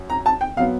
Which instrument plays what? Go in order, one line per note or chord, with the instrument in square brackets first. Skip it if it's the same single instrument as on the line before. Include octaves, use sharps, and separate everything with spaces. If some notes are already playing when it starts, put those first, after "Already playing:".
Already playing: [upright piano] F#2
A#5
A5
G5
B2 F#3 B3 F5